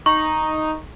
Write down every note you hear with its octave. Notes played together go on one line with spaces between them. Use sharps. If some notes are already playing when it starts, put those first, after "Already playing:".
D#4 C#6